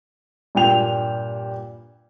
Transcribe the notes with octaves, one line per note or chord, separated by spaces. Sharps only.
G2 A#2 G5 F7